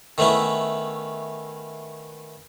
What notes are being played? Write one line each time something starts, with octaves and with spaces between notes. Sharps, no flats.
D#3 A3 B3 C#4 E4